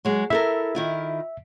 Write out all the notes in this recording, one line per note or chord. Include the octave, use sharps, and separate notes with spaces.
F#3 G#3
E4 A4 A#4 E5
D#3 E4 F4